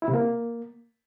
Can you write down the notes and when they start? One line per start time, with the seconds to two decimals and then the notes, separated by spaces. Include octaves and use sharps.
0.02 E4
0.08 C3
0.13 A#3